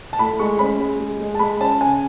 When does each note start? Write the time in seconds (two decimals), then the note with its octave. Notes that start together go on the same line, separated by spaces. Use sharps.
0.13 A5
0.19 A2 B5
0.39 G#3 C#6
0.59 C#4 B5
0.79 G#3
1.00 G#3
1.20 G#3
1.35 A5
1.39 G#3 B5
1.61 C#4 A5
1.81 C#3 G#5